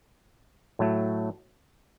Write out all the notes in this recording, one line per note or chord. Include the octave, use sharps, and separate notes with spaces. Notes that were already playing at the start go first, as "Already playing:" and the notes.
A2 F#3 A3